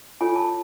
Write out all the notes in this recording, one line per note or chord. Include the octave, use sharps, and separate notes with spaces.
F4 A4 C#5 G#5
A5